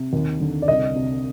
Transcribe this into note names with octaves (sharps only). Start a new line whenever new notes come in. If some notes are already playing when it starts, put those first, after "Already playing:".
Already playing: C3
D#2
D3
D5
C2 D#5
C3